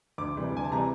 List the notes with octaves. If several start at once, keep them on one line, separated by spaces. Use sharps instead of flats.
D2 D6
C3 E3 G3
D2 G#5
A5
C3 E3 G3 A#5